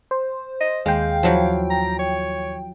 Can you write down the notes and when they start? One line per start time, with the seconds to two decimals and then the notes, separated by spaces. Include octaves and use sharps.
0.11 C5
0.61 D#5
0.86 D#2 G#3 F5 G5
1.23 F3 F#3 E4
1.70 A#5
1.99 C#5